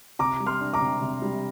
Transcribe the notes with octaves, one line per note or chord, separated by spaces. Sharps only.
C3 A#5 D6
G3
C6 F6
D4
A#5 D6
C3
C3
G3